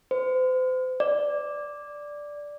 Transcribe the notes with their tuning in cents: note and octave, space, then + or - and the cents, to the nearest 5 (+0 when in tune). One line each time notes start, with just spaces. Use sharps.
C5 -40
D5 +0